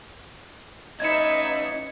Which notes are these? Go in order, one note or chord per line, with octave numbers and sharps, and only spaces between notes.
C#4 D#4 E4 B4 E5 G#6 C#7